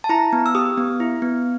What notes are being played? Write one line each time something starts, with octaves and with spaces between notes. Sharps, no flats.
A5
E4 A#5
B3
E6
G4 D#6
B3
E4
B3